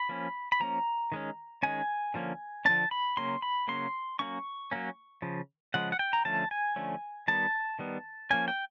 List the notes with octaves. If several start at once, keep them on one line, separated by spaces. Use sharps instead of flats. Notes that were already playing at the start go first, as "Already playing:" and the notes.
Already playing: B5
F3 A#3 C#4
B5
F3 A#3 C#4 A#5
D#3 G#3 C#4
D#3 G#3 C#4 G#5
D3 F3 A#3 C#4
D3 F3 A#3 C#4 A5
B5
C#3 F#3 A#3 C#4 C6
B5
C#3 F#3 A#3 C#4 C6
F#3 A#3 C#4 C#6
F#3 A#3 C#4
C#3 F3
C#3 F3 G#3 F#5
F#5
G5
A#5
D3 F3 A3 C#4 A5
G#5
D3 F3 A3 C#4
D#3 G3 B3 A5
D#3 G3 B3
F3 A#3 C#4 G#5
G5